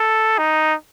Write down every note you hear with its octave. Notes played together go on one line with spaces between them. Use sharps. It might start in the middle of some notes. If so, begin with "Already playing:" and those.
Already playing: A4
D#4